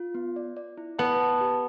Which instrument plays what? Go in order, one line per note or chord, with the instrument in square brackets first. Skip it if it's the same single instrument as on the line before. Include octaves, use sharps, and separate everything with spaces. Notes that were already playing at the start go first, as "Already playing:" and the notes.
Already playing: [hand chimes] F4
B3
D5
D5
E4
[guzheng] B3 [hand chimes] A5
[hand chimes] A5
G4